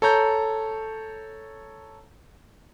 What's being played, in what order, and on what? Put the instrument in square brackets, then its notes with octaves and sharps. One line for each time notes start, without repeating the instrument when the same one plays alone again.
[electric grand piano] A4 C#5 A#5 G6